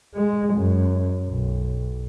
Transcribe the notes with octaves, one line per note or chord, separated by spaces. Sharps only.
G#3
F#2
B1